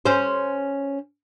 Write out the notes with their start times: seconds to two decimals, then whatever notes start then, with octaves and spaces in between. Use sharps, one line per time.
0.06 C#4 C5